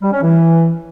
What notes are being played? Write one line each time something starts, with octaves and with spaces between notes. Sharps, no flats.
G3
C#4
E3